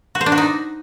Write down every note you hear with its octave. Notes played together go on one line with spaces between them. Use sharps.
F#4
C5
D4
F#4
D#4